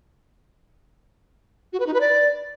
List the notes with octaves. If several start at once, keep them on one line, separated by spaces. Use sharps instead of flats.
F#4
B4
D#4
B4
D5